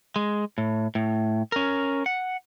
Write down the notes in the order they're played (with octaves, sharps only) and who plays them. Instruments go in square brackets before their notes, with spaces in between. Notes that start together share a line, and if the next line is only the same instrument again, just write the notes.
[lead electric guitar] G#3
A2
A2
C#4 A#4
F#5